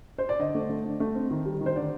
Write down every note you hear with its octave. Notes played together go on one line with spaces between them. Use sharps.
C5
D5
D3 D#5
A3
A3
D3
A3
C4
D#3
G3
D#3
C5
D3 D5